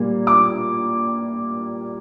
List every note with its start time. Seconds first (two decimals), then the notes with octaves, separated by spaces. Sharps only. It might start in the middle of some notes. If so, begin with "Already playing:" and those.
Already playing: A#2 G3 A#3
0.27 D6